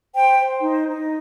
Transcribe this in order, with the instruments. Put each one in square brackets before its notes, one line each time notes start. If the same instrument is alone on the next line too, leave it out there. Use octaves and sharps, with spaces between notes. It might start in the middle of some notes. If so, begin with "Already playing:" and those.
[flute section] C5 G5
C5
D#4
D#4